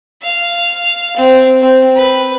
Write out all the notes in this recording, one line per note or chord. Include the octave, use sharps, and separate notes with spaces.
F5
C4
C4
B4